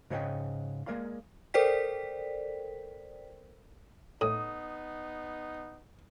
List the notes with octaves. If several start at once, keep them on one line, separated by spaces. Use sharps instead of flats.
G#2 C#3 C#5 D#5 F#5 G5
G#3 A#3 A#4 D5 F5 C6
A4 A#4 C5 D5 G5 B6
A2 B3 D#4 D#6